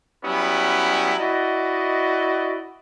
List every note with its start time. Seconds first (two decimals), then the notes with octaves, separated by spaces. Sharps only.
0.25 F#3 G3 B3 C#4 E4
1.20 E4 F#4 D5 D#5